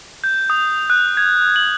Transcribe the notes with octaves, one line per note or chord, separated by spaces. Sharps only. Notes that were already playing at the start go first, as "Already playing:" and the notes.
G6
D#6
F#6
G#6
F#7